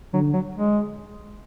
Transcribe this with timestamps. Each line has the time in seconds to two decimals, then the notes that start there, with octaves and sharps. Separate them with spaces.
0.13 D3 F#3
0.33 F#3
0.54 G#3